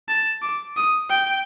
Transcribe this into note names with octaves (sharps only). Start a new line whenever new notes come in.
A5
D6
D#6
G5